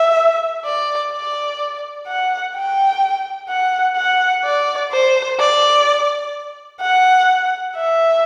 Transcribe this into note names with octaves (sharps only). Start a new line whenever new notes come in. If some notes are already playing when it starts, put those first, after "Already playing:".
Already playing: E5
D5
D5
F#5
G5
F#5
F#5
D5
C5
D5
F#5
E5